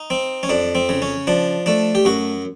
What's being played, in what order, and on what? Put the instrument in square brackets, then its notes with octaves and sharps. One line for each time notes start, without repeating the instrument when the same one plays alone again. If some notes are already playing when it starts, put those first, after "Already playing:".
Already playing: [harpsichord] D#4
C4
C#4
F2 D4
C4
C#3
C#4
F3 D4
A3 D4
G4
F#2 F#4